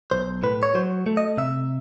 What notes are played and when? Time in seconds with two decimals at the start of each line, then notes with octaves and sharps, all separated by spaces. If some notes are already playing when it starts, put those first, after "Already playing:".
0.11 B1 C5
0.43 A2 B4
0.63 C#5
0.75 F#3 C5
1.06 A3
1.17 D#5
1.37 C3 E5